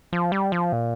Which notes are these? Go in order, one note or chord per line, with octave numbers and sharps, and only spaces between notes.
F3
G3
F3
A#2